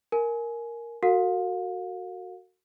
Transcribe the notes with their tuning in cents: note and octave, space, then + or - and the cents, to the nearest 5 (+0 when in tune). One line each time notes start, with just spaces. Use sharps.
A#4 +0 G#5 +20
F#4 +0 A#4 -45 F5 +35